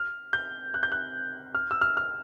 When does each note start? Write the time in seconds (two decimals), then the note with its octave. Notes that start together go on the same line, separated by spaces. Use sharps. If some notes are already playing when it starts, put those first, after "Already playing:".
Already playing: F6
0.33 G6
0.74 F#6
0.83 G6
0.92 F#6
1.55 F6
1.71 E6
1.81 F6
1.97 F6